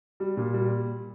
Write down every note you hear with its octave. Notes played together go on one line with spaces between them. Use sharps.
G3
A#2
G3